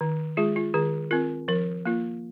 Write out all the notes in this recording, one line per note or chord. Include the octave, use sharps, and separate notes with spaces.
D#3
G#3 F4 G#4
F4
D#3 G#4
C4 F4 A#4
F3 A#4
A#3 F4